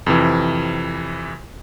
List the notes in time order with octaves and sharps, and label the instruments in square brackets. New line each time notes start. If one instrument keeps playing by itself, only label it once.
[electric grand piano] F2 C3 E3